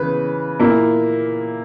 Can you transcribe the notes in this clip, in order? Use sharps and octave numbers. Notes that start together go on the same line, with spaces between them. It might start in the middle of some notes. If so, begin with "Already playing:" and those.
Already playing: C#3 E3 B4
A#2 A#3 E4